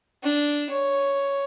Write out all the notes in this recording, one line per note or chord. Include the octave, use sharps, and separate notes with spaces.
D4
C#5